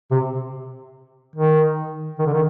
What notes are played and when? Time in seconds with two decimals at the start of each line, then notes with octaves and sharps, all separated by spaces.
0.11 C3
1.36 D#3
2.19 D#3
2.26 D3
2.33 D#3